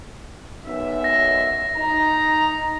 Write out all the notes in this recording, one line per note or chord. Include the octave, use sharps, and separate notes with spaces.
B1 F#2 E5
A#6
D#4 A#5